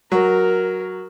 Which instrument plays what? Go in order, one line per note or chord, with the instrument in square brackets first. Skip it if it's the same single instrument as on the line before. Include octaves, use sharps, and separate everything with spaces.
[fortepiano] F#3 [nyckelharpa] A#4